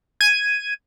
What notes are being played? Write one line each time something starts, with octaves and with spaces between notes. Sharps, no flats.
G#6 D#7